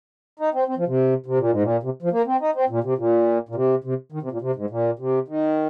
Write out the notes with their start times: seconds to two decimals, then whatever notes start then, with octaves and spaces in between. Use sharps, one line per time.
0.39 D#4
0.54 C4
0.68 C4
0.78 F3
0.87 C3
1.26 C3
1.38 A#2
1.51 G#2
1.63 A#2
1.83 C3
2.02 F3
2.12 A#3
2.27 C4
2.41 D#4
2.55 C4
2.69 A#2
2.84 C3
2.98 A#2
3.49 A#2
3.55 C3
3.84 C3
4.12 D#3
4.22 C3
4.31 A#2
4.41 C3
4.56 G#2
4.70 A#2
4.99 C3
5.28 D#3